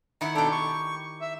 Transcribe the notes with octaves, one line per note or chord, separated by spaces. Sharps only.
D#3 E4 F#5
B2 D4 G4 A4 G5
C#6
E5